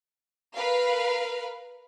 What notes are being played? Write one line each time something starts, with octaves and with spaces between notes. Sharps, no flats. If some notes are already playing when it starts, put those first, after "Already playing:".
A#4 B4 F5